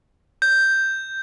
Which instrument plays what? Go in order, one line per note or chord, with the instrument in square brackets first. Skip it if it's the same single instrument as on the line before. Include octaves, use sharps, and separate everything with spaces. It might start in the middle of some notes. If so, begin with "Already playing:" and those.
[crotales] G6